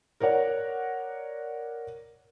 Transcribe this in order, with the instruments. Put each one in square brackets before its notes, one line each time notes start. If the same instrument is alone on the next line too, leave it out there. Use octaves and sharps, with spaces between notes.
[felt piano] A#4 C#5 D5 F#5